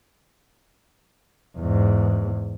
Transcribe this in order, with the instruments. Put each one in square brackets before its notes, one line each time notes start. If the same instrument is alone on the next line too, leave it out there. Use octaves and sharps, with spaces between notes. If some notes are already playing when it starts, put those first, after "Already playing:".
[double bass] E2 G#2